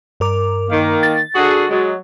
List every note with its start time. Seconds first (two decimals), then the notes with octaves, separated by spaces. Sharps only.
0.20 G2 A#4 D6
0.70 D#3 A#3
1.03 A6
1.35 D3 F#4 G#4
1.70 F#3 G#3